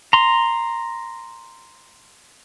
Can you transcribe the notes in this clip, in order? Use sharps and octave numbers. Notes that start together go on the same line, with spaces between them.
A#5 C6